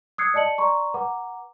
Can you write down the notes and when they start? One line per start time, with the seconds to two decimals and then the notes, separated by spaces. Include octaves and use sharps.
0.18 D#6 E6 F#6 G#6 C7 C#7
0.34 D5 D#5 A5 C#7 F#7
0.58 D5 A#5 C6 C#6
0.94 B4 F#5 A#5 D6